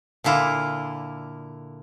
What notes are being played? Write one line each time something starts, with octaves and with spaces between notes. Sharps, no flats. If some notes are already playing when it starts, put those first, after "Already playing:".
A#2 D3 E4 F4